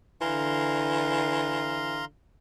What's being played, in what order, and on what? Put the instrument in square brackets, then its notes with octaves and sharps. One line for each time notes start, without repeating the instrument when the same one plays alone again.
[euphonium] D3 [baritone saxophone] E3 [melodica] F5 A#5 C6